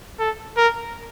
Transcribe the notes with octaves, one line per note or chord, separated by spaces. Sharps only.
A4
A#4